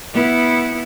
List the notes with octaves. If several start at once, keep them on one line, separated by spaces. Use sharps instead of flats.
B3 E4